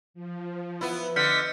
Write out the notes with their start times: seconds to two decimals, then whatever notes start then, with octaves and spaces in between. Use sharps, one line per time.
0.14 F3
0.81 B3 E4
1.16 D3 D#5 F6 G6 B6 C#7